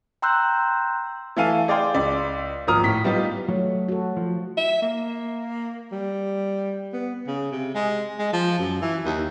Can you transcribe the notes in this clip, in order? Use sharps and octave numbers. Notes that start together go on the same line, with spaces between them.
G5 A#5 C6 E6 F#6 G6
E3 A3 A4 F5 G#5 D#7
G#4 D5 F5 G5 C6
C#2 D5
G#1 F3 A#3 A#5 D#6 F6
A2 B6
G3 B3 D#4 F4
F#3 A3
F#4 A4
F3
E5
A#3
G3
B3
C#3
C3
G#3
G#3
F3
F#2
E3
D#2